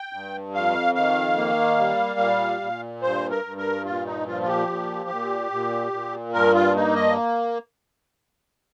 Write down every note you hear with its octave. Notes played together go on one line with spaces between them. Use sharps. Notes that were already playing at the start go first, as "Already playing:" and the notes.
Already playing: G5
G2
F2 F5
D#3 F5
A#3
G3
A#2
A#2
G2 C5
A#4
G2
A#4
A#2 F4
D#4
F3 F4
F4
G4
A#2
A#2
A#2
A#2
G2 A#4
F4
A#3 D#4
D#5